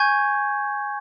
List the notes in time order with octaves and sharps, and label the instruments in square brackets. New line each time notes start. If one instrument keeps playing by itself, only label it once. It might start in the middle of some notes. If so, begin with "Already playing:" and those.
Already playing: [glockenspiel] G#5 C#6 G6 G#6